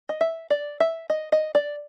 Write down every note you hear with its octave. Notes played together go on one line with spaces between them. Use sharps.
D#5
E5
D5
E5
D#5
D#5
D5